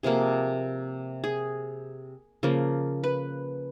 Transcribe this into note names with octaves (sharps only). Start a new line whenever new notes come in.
C3 F3 A#3 G#4
G#4
C#3 F3 A#3
B4